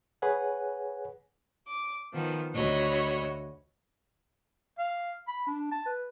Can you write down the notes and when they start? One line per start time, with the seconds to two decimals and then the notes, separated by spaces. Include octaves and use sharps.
0.22 G#4 B4 C#5 F#5 G#5
1.66 D6
2.12 D#3 F3 B3
2.53 D2 F#4 C#5 D#5 B5
4.79 F5
5.28 B5
5.47 D4
5.72 A5
5.86 B4